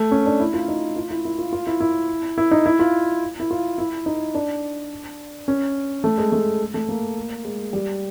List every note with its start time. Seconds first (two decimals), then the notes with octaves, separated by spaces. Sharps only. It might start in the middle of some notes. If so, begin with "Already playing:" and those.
Already playing: A3
0.11 C#4
0.26 D4
0.40 E4
0.54 F4
0.68 D#4
0.96 F4
1.11 E4
1.25 E4
1.39 F4
1.53 F4
1.67 E4
1.80 E4
2.38 E4
2.51 D#4
2.66 E4
2.79 F4
3.40 E4
3.51 F4
3.78 E4
4.06 D#4
4.35 D4
5.48 C#4
6.04 A3
6.18 G#3
6.32 A3
6.74 A3
6.89 A#3
7.45 G#3
7.73 G3